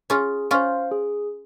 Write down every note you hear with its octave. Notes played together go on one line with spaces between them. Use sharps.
C#4 F4 G#4
C#4 F4 C5 F5
G#4